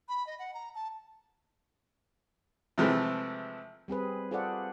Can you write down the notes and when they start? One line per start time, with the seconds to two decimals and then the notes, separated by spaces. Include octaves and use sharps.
0.09 B5
0.27 D#5
0.39 F#5
0.54 A#5
0.75 A5
2.78 C3 E3 F3 G#3 A3 C4
3.88 G3 C4 G#4 B4
4.31 F4 G#4 A4 C5 D5 F#5